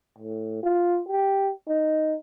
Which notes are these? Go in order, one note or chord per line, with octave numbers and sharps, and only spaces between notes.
A2
F4
G4
D#4